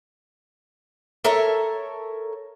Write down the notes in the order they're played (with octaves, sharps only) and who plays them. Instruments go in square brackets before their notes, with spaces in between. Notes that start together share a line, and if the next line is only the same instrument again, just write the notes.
[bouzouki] A4 A#4 C#5 E5